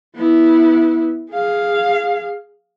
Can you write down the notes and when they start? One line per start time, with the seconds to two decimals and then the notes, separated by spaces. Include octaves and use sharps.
0.15 B3 E4
1.32 G#4 F5